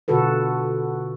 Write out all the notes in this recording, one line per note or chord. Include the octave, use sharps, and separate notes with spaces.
B2 D3 F4 F#4 A4 B4